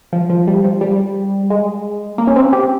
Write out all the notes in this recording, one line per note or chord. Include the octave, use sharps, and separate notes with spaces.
F3
F3
G3
F3
G3
G#3
A#3
C#4
C4
G4